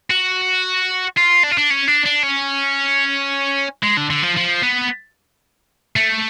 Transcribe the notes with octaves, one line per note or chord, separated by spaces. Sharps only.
F#4
F4
D4
F4
D4
C#4
D4
D4
C#4
G#3
D3
D3
F3
F3
B3
A3